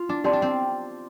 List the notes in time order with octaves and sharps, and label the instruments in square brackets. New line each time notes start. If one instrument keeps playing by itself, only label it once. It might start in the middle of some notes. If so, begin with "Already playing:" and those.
Already playing: [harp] F4
D4
[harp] C4 [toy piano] G4 D5 A5 C6
[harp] D4
C4